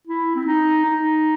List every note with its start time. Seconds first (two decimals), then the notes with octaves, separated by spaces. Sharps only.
0.07 E4
0.35 C4
0.46 D#4
0.85 D#4